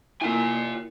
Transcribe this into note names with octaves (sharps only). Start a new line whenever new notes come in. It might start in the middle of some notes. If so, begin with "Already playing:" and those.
A#3 E4 F4 G#5